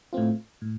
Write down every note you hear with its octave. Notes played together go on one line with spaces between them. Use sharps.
A2 A3 C4 F4
A2